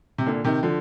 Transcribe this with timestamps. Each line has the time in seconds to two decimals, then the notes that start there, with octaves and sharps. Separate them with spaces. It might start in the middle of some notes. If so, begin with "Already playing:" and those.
0.18 C3
0.26 A#2 D3
0.44 C3 D#3
0.63 D3 F3